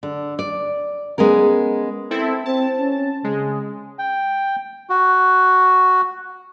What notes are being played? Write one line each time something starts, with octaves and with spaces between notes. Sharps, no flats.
D3
D5
G#3 B3 C#4 A#4
C4 E4 A4
C4 A5
C#4
C#3 G#3
G5
F#4